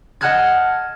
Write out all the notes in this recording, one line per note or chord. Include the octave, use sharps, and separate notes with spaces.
D#5 F#5 A5 F6 F#6 G#6